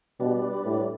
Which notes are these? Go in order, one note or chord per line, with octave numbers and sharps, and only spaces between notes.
B2 G3 D4 G4 B4 D5
A2